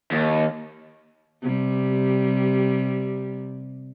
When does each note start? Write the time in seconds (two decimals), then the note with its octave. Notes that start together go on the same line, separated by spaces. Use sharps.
0.11 D#2
1.42 C3 G3